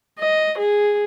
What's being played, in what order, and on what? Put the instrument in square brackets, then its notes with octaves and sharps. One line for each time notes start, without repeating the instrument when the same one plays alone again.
[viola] D#5
G#4